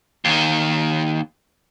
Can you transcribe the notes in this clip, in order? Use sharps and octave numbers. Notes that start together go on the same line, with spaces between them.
D#2 D#3